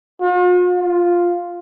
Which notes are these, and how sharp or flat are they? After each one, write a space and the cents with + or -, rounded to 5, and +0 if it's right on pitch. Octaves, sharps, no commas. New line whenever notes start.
F4 +45
F4 +5